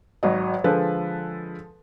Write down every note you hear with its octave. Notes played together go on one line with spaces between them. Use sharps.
G#1 F#3 D#5
D3 F3 G#3 A4 B4